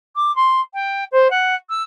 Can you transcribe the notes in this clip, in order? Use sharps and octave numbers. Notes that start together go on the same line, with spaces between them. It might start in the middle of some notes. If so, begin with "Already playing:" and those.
D6
C6
G5
C5
F#5
E6